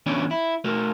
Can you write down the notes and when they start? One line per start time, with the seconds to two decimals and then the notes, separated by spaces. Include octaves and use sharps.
0.06 E3 B3 C#4 D4 C#5 D5
0.31 E4
0.64 A3 F#4 A#4